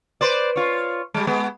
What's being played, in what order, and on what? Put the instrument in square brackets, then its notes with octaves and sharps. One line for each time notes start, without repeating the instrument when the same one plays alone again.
[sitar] B4 C5 D5
F4 C#5
G3 G#3
G#3 B3